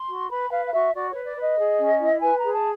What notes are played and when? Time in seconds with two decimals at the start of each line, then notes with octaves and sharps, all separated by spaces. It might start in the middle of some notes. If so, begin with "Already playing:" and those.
Already playing: C6
0.08 F#4
0.30 B4 B5
0.51 B4 F5
0.66 F5
0.72 F#4 E5
0.93 F#4 D5
1.09 C#5
1.15 B4
1.25 D5
1.36 B4
1.42 D#5
1.57 G#4
1.79 C#4
2.00 E4
2.21 B4 G#5
2.37 A#5
2.42 G#4
2.53 A5